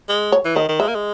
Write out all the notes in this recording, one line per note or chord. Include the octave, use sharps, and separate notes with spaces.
G#3
C#5
E3
D#3 D#5
D#3
G#3 E5
A#3
G#3